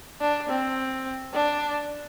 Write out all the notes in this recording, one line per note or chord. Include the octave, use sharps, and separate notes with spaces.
D4
C4
D4